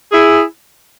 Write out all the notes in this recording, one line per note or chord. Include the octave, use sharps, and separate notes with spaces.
E4 G#4